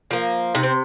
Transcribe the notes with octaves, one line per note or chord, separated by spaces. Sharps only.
F3 A#3
C3 D#4
C4